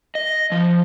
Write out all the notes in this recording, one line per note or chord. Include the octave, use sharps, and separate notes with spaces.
D#5
F3